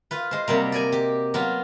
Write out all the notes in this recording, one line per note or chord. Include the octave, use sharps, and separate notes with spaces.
F4 B4
G#3 C5
C3 F#3 G3 A#3
D5 D#5 G#5
G4
F#3 B3 F4